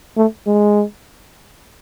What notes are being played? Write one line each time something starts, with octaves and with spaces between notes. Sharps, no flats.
A3
G#3